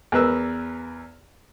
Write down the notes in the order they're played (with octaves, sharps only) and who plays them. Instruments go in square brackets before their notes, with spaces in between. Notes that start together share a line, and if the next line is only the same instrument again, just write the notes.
[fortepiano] E2 A#4 B4 E6